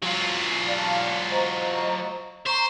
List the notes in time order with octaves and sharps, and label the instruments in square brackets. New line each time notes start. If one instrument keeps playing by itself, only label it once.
[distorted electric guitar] F#3 F4
[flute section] D5 F5 A5
C5 D#5 A#5
[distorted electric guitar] C5 [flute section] A#5 C#6